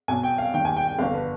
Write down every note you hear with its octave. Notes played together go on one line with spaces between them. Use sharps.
B1 B2 G#5
G5
F5
D#2 D#3 G5
G#5
G5
G5
G1 F2 D3 F5
B4